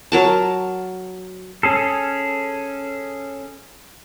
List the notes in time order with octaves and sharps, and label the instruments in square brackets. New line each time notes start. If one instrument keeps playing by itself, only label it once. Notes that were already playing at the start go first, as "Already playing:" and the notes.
[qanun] F#3 A#4 A5
[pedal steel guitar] C#4 G#4 A4